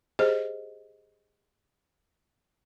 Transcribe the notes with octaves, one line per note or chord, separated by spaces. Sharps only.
G4 G#4 C5 D#5